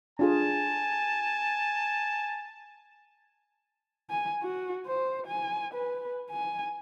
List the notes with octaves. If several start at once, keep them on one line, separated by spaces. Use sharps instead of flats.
D4 F4 G#4 G#5 A5
G#5
F#4
C5
G#5
B4
G#5